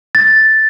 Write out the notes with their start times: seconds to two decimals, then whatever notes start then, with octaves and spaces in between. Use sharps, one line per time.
0.15 A6